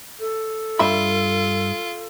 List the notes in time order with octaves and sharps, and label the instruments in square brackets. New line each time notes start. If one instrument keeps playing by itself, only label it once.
[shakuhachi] A4
[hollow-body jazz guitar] G2 E5 B5 [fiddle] F4